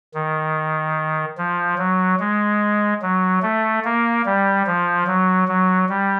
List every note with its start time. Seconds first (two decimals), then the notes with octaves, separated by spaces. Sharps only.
0.14 D#3
1.37 F3
1.78 F#3
2.20 G#3
3.02 F#3
3.43 A3
3.85 A#3
4.26 G3
4.67 F3
5.07 F#3
5.48 F#3
5.89 G3